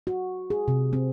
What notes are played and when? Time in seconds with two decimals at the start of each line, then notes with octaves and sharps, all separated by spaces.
0.07 F#4
0.50 G#4
0.68 C3
0.93 C4